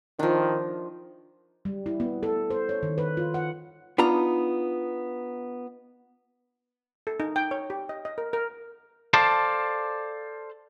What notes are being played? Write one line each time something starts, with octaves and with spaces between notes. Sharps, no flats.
D#3 F3 D4
G3
E4
B3
A4
C5
C#5
D#3
B4
F4
F#5
B3 D4 D#4 F4 A#5
A4
D#4
G5
C#5
G4
D#5
D#5
A#4
A#4
A4 C5 D5 F5 A5